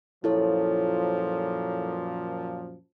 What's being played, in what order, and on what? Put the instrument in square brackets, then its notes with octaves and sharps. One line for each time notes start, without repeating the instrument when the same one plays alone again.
[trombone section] F#2 A#2 F3 [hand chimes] E4 A4 C#5